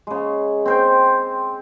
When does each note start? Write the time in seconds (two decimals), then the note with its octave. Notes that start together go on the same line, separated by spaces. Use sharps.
0.07 C#3 G#3
0.65 C4 C5 G5